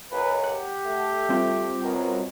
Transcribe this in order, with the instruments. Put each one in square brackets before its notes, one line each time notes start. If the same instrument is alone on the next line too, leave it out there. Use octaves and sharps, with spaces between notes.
[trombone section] C#2 F#2 [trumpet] B4
[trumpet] G4 [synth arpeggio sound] F#5
[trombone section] A3
[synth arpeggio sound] G3 C4 F4
[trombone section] F#2 B2 [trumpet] A#4